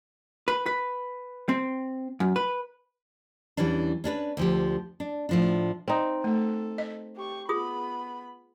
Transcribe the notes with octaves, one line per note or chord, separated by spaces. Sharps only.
B4
B4
C4
F#2
B4
E2 E3 G3 C#4 D4
C#4 D4 G4 B4
D2 F3 G4
D4
A2 F3 D4
C4 D#4
A3 A4
D#5
G4 C#6
B3 F4 G#4 B5 D#6